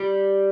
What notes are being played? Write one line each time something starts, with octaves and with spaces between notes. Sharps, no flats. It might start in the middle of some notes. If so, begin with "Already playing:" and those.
Already playing: G3